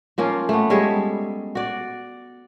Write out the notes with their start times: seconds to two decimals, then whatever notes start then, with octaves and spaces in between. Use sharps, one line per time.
0.18 F3 A#3 C#4 F4
0.49 A3 B3
0.70 G3 G#3 A4 C#5
1.55 F#4 D5